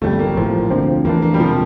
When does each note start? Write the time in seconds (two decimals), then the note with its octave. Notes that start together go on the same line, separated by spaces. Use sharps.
0.02 G1 F2 C3 G3 A3
0.19 A#3
0.37 A#1 A2 F3
0.70 D2 D3 F3 C4
1.05 F2 E3 A3 A#3 D4
1.22 A#3
1.34 G3
1.39 E1 C3 F3